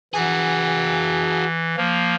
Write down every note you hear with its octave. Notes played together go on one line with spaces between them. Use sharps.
E3 F#4 G#4
F3 A#3